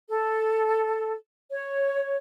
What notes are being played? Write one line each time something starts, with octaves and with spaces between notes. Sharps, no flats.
A4
C#5